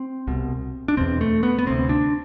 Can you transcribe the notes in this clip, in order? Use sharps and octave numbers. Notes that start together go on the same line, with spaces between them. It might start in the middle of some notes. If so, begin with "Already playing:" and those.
Already playing: C4
C2 B2
D4
E2 B2 C4
A3
B3
B3
D2 C3 C4
D4